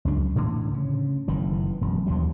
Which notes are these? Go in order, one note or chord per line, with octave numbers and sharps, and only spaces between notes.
C#2 F#2 D4
A2 D3 E3
C#3
F#1 D#3 E3
E1 F#2
D#2 E3 F#3 G3